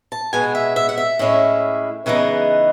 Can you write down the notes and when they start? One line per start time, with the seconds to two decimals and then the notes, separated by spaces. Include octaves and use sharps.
0.12 A5
0.33 B2 G#3 B3 G#5
0.55 E5
0.76 E5
0.89 F#5
0.98 E5
1.19 A2 G#3 C#4 E4
2.06 C#3 E3 G#3 B3 D#4